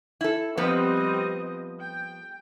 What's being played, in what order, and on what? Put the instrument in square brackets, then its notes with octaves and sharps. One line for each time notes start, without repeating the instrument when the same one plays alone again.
[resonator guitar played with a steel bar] E4 A4
[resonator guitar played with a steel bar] F3 B3 B4 [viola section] G3 C4 D#5
[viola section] G5